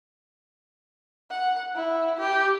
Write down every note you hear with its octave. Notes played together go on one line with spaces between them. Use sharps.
F#5
E4
G4